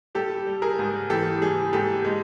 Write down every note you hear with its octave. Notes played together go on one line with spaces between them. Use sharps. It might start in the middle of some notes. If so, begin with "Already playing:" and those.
G3 G4 A4
G3
G#4 A#4
G#2
E3 G4 A4
G3 G#4
G#2 G4 A4
G#3